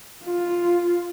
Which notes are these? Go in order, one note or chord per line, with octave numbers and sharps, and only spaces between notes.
F4